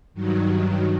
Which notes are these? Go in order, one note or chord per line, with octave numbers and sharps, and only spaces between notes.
G2 D#3 F#3